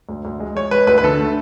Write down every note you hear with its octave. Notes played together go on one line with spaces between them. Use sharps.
D2
D2
G#3
G#3 C#5
G#3 B4
D2 B4
B4
D3 A4
A3